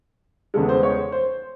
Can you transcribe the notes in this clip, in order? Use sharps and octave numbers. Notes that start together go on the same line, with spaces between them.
E2 C#3 G#3 A4
C5
C#5
C5